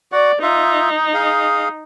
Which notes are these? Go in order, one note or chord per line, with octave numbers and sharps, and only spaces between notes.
F#4 D5 F#5
D#4 F4 E5
G#4 F5